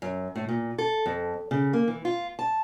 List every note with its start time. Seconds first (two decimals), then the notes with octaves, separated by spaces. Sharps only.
0.02 F#2
0.36 A2
0.49 A#2
0.78 A4
1.06 F2
1.51 C#3
1.73 A#3
1.88 E3
2.05 F4
2.39 A5